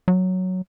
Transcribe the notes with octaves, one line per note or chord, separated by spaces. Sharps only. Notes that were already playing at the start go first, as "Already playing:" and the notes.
F#3